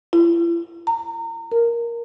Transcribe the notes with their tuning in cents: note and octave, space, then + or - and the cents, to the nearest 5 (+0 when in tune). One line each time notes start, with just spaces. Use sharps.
E4 +45
A#5 -30
A#4 +5